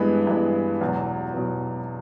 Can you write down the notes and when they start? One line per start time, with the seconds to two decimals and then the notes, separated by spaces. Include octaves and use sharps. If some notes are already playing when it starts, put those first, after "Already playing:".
Already playing: G2 E3 G#3 B3 B5
0.27 G2 E3 G#3 B3
0.81 E2 B2 F#3
1.34 E2 B2 F#3